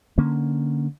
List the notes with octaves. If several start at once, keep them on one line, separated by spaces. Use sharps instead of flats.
D3 A#3 C#4